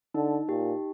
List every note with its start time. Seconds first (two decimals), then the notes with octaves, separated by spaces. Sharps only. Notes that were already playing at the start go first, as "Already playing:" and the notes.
0.14 D3 D#4
0.49 A#2 G4